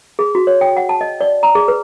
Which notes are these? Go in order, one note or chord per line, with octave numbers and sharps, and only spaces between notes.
G#4
F#4
C#5
G5
F#5
A5
D#5
D5
A#5
G#4
B4